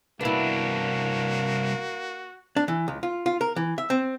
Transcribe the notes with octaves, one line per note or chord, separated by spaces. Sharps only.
C2 A#3 B3 D4 E4 F#4
D4
E3
C#2
F4
F4
A#4
E3
E5
C4